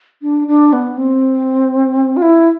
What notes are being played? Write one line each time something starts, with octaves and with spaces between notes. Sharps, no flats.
D4
D4
B3
C4
F4
E4